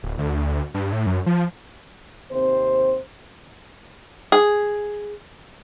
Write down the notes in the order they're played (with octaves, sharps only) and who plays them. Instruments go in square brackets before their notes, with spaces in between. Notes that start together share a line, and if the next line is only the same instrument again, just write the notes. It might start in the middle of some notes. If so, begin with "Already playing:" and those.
[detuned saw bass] D1
D2
G2
A2
F#2
F3
[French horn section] D#2 C3 C4 C5
[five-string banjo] G#4